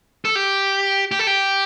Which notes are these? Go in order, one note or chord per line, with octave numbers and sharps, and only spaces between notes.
A4
G4
G4
A4
G4